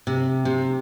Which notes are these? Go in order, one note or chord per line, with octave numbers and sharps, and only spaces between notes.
C3
C3